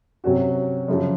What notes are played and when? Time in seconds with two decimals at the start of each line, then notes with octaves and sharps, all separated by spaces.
0.24 C3 F#3 C#4 F#4
0.88 F#2 C#3 F3